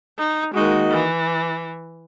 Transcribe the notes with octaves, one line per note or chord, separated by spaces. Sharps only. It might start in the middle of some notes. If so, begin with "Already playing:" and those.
D#4
D#3 G#3 A#3 D#4 F#4
E3